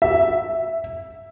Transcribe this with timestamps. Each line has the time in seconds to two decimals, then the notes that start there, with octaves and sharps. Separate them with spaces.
0.02 E5